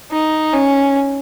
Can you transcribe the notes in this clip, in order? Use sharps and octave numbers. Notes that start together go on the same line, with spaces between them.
D#4
C#4